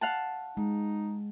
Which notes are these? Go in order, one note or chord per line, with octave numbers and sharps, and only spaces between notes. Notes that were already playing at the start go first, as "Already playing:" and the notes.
F5 F#5 A5
G#3 D#4